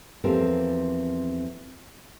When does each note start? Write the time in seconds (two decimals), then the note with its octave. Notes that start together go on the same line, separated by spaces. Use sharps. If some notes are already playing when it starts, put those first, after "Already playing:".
0.24 E2 F3 C4 G4 A4 A#4